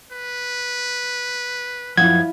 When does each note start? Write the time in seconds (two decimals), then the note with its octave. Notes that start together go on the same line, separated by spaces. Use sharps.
0.12 B4
1.97 F#2 F3 E4 F4 F#5 G#6